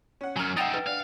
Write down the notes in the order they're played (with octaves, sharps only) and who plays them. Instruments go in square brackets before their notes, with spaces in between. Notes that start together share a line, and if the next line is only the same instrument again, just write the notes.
[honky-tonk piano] C#4 F#5
[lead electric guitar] F#2 F#3 [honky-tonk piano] G#5 A#5 F6
[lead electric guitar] D#4 E5 [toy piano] F#5 G5 D#6 [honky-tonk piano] A6 D7 E7
[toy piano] B4
[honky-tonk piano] D4 F#5 [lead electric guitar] F5